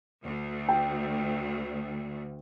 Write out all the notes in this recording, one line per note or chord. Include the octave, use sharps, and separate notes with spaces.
D2
G5